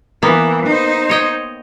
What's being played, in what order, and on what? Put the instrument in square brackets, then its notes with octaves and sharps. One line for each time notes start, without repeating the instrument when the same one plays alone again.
[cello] E3 [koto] A#3 B3
[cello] D#4 C5
[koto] C#5 D#5 G5